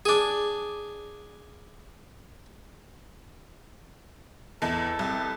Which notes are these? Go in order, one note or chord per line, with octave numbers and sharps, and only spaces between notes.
D4 G#4
E2 E4 A4 D#5 A5
C2